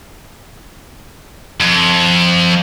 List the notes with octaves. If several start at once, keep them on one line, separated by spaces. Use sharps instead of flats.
F2